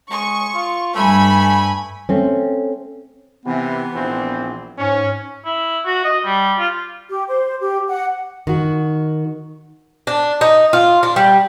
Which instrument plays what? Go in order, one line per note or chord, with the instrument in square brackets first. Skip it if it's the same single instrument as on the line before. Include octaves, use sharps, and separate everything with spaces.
[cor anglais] G#3 [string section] C#6
[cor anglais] F4
[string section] G2 G#5 B5 [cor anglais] A3
[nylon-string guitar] A3 C4 C#4
[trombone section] C3 E3 [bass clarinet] B3
[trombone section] A#1 E3 C4
[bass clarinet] G#2 [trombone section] C#4
[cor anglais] E4
F#4
D#5
G3
F4
[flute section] G4
C5
G4
F#5
[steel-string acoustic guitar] D#3 F#4
[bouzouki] D4
D#4
F4
D4
G3